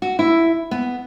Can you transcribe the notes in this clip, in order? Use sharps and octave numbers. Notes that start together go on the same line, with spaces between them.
F#4
E4
B3